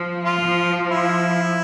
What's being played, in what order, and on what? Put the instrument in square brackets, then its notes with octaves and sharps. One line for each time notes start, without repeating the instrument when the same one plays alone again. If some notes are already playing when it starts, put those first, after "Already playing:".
Already playing: [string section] F3
[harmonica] F4
[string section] F3
[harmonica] E4